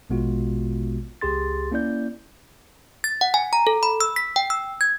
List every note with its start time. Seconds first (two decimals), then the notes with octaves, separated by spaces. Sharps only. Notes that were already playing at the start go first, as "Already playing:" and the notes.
0.10 A#1 B2 G#3 B3 F4 F#4
1.21 C#2 G4 G#4 C6 A6
1.71 A#3 C#4 E4 D5 G6
3.04 A6
3.21 F#5
3.34 G#5
3.53 A#5
3.67 A4
3.83 B5
4.01 E6
4.16 B6
4.36 G5
4.50 E6
4.81 G#6